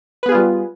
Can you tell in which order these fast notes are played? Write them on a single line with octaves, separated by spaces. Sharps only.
B4 B3 G#4 F4 G3